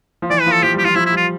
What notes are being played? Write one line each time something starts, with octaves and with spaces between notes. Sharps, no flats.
F3
E3 D5
B4
F3
A4
F3 G4
G3 G4
F3 F4
F3 E4
E4
G3 F4